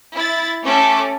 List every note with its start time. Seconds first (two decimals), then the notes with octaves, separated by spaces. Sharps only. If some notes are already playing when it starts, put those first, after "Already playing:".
0.15 E4 A6
0.64 A3 C#4 G4 A4 D6